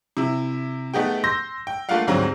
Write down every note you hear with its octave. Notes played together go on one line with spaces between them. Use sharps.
C3 E4
A3 B3 D#4 G4 G#4 G5
C6 E6 G6 A#6
G5
A3 A#3 D4 F4 F5 F#5
D2 G#2 F#3 G3 C4